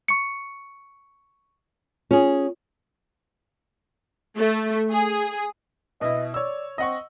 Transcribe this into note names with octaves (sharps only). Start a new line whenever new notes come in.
C#6 C#7
C#4 F4 G#4
A3
G#4
B2 E4 D#5
C#5 D5 E6
C4 D#5 F#5 C#6